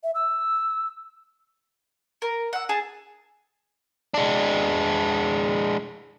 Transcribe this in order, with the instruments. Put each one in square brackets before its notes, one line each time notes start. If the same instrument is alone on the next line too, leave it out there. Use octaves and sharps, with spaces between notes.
[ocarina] E5
E6
[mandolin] A#4
F#5 E6
G#4 A5
[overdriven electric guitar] G#3 D4